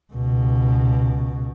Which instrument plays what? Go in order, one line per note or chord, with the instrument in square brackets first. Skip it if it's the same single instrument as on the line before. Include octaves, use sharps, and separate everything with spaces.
[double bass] C#2 B2